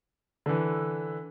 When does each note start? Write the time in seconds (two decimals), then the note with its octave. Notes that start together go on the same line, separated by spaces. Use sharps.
0.46 D3 E3